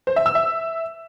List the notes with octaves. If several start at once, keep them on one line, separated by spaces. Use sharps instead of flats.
C5
E5
E6
E5